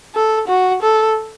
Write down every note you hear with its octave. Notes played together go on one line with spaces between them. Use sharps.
A4
F#4
A4